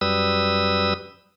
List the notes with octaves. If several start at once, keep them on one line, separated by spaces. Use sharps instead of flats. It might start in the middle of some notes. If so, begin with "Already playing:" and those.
F#2 G3 B4 D#6 E6